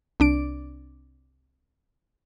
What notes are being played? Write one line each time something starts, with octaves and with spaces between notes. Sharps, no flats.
C2 D4 D7